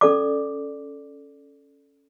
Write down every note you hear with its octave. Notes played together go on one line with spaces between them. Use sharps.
C#4 A4 D5 D6